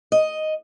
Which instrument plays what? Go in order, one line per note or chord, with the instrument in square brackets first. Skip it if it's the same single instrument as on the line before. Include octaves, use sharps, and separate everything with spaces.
[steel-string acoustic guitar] D#5